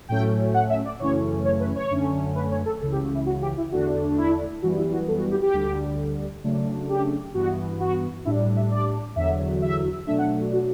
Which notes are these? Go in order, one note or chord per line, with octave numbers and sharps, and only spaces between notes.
A2 F#3 A3 C#4 G5
F#5
E5
D5
F#2 C#3 E3 A3 C#4 C#5
C#5
B4
C#5
F#2 D3 A3 C#4
B4
C#5
A4
C#2 C#3 E3 A4
G4
F#4
E4
F#4
G4
E4
E2 D3 A3 D4 F#4
E4
F#2 E3 G3 B3 F#4
E4
F#4
A4
F#4
G4
G4
D2 D3 G3
C#3 F#3 A3 D4
G4
G2 E3 B3 F#4
F#4
A2 G3 D4 E4
E5
D5
E2 D3 F#3 E5
E5
B2 F#3 A3 D4 E5
F#5
F#4
F#4